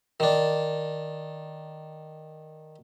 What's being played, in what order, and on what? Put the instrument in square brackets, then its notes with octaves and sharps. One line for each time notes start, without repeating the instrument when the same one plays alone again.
[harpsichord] D#3 D4